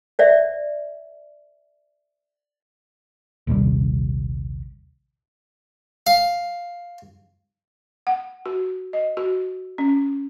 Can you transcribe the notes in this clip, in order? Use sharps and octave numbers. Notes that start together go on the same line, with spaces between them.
C5 D5 E5
A#1 D#2 C3 G3
F5
F#5
F#4
D#5
F#4
C#4